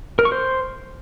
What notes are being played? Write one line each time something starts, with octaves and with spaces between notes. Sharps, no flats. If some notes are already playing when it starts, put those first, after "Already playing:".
A#4
C#6
C5